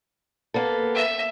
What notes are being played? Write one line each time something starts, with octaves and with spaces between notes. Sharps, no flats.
A#3 B3 A4
E5